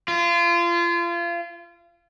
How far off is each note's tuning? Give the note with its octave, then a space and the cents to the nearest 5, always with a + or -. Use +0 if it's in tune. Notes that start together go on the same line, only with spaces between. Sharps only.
F4 -30